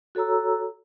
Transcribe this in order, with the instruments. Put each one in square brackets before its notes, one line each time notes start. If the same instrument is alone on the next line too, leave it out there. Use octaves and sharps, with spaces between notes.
[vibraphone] F#4 A4 C#5 A#5 E6